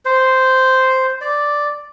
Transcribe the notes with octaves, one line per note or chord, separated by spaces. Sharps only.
C5
D5